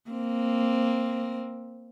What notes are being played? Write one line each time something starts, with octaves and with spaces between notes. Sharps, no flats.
A#3 C4